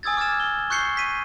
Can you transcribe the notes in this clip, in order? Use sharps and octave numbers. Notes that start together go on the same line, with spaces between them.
G#5 D#6 E6 G#6 A6
D6 F6 G#6 A6 E7
G7
C#6 F#6 G6 C7 C#7 G7
B6 D#7